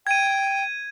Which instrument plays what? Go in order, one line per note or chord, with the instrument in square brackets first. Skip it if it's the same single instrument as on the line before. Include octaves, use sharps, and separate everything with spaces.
[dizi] G5 [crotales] G#6 D#7